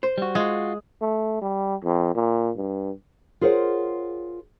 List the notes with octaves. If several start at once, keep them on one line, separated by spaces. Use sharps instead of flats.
C5
G3 F#4
G#3 F4 F#4
A3
G3
F2
A#2
G2
F4 G#4 A#4 C5 C#5 F#5